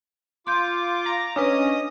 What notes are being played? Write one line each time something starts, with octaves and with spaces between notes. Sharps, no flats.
F4 C6 D6 G6
A#5
C#4 D4 B4 D#5 D#6